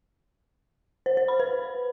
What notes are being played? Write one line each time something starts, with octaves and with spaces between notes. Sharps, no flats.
C5
C5
B5
B4